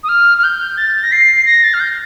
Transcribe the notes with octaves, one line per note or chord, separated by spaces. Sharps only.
D#6
F6
F6
G6
A6
A#6
C7
A#6
A6
F6
G6